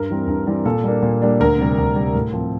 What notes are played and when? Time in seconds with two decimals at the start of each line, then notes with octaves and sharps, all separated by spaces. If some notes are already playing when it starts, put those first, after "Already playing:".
Already playing: G2 A#4
0.09 E3 G3 C4
0.27 G2
0.46 E3 G3 C4
0.66 A#2 A4
0.84 G3 A#3 D4
1.03 A#2
1.22 G3 A#3 D4
1.40 D2 A#4
1.58 C3 G3
1.78 D2
1.96 C3 G3
2.15 A2
2.33 F3 C4